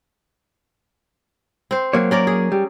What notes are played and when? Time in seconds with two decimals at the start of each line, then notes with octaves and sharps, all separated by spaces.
1.71 C4 C5
1.93 F#3 A#3 C#5
2.11 C#4 A#4 D5
2.27 G#4
2.52 G3